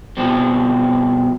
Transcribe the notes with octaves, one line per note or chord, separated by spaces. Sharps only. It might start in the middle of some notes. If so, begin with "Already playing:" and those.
B2 F3 G3 C4